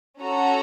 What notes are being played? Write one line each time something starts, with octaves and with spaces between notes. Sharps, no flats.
C#4 F#4 A4 A#5